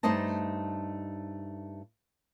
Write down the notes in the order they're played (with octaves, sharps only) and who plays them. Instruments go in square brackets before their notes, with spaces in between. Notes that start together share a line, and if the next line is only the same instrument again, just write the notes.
[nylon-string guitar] G2 A3 D#4 C5 D#5 A5